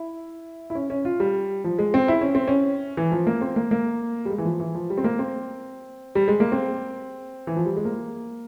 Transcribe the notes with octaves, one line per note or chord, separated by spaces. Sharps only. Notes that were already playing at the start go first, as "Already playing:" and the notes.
Already playing: E4
E4
C#4
C#4
F4
G3
F3
G#3
C4
E4
C#4
C4
C#4
E3
F3
A#3
C4
A#3
A#3
G3
G#3
E3
F3
E3
F3
G3
C4
A#3
C4
G3
G#3
A#3
C4
E3
F3
G3
G#3
A#3